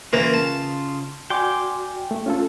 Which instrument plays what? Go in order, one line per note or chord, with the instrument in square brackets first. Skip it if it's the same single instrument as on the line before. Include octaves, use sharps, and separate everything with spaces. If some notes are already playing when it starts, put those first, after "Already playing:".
[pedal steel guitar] C#3 F4 [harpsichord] E3 A#3
[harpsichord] A5
[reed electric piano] F#4 D5 G#5 [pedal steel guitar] G5 C6 D6
[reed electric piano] A3
C#4 F4 A4